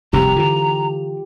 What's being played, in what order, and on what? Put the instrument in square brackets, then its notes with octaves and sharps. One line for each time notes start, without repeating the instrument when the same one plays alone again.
[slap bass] F1 C2 G#2 [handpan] G4 [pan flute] A#5
[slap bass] D3 E3 [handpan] F4